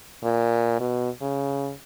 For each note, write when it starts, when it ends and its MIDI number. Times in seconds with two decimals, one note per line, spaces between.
0.24 0.76 46
0.80 1.10 47
1.21 1.72 49